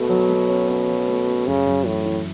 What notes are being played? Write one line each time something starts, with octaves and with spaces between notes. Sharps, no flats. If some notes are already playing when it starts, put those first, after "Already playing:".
Already playing: B2 A3
F#3
A3
C#4
C#4
F#3
A3
C#4
F#2 C#3
F#2
A2 E3
E3